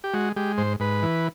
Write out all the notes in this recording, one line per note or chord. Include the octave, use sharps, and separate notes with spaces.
G4
G#3 F#4
G#3 G4
G#2 C5
G#2 B4
E3